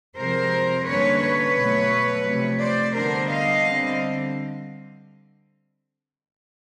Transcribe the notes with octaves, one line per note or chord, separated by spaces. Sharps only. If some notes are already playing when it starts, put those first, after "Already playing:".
C3 F3 G#3 C4 A#4 C5
D3 G3 A#3 C#4 B4 C#5
B4 C#5
B2 F#3 A3
C3 F3 A3
C5 D5
D3 G3 B3 D4 A#4 C5
D#5 F5
D3 G3 C4